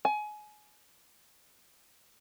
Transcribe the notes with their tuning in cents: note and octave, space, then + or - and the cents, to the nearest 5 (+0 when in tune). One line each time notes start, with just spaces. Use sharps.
G#5 +25